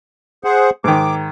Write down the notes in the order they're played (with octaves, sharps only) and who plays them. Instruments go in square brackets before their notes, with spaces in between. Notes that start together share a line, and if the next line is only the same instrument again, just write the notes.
[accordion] G#4 C5 F#5
[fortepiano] G#2 D#3 [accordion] D6